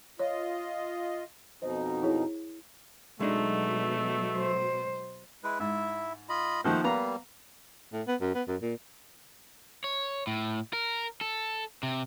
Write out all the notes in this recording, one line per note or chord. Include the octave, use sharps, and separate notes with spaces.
F4 C#5 D#5
F2 B2 D#4 C5 D#5
E4 G#4 C#5
B2 F#3 G#3 A3 D4 D#4
C5
G#3 E4 B4
G#2 E4 E5
F4 D#5 B5
D#3 F3 A3 A#3 C5 F#5
G3 A#3 B3 F5 A#5
A2
B3
F#2
B3
F#2
A#2
C#5
A2
A#4
A4
C3